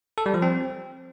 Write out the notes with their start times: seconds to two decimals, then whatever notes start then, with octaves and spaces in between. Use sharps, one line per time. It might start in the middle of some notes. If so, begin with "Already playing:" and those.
0.18 A4
0.26 G3
0.34 F3
0.42 C4